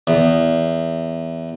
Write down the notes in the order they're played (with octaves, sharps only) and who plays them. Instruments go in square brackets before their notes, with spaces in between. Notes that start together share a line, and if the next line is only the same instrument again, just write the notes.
[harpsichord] E2